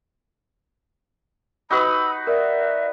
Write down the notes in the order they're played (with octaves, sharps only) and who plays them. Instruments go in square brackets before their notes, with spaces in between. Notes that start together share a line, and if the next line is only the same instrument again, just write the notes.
[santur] D#4 F#4 B4 [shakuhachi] B5 [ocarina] E6
[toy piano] A#4 [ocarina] D5 [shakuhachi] E5